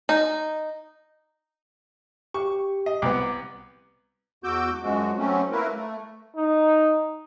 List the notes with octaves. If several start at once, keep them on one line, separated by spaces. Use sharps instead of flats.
D#4
G4 C#6
D#5
C2 B3 D6
E2 F#4 D6 E6 G6
F#2 F3 G#3 F#4
F#3 A3 C4 C#4
A3 A#3 E4 A#4 B4
A3
D#4